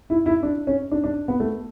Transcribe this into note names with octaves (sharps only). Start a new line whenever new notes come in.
E4
E4
D4
C#4
D4
D4
B3
A3